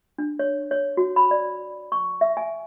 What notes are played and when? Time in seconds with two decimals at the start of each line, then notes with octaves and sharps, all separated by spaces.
0.18 D4
0.39 C#5
0.71 C#5
0.97 F#4
1.16 B5
1.31 D5
1.92 C#6
2.21 E5
2.37 G#5